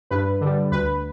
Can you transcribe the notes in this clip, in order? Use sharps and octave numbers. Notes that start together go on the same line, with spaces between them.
G2 B4
D3 G3
D2 B4